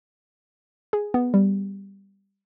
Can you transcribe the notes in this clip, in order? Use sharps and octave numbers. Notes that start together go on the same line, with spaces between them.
G#4
B3
G3